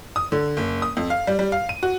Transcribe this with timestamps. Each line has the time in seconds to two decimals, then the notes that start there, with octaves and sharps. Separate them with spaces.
0.16 D#6
0.32 D3
0.57 F#1
0.82 D#6
0.97 F2
1.10 F5
1.27 G3
1.39 G3
1.52 F5
1.69 D#7
1.83 F#4